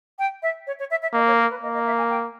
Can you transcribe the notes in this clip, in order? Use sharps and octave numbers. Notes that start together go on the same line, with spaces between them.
G5
E5
C#5
C#5
E5
E5
A#3 D#5
C#5
A#4
B4
A#3 D#5
D#5
E5
G#5
G5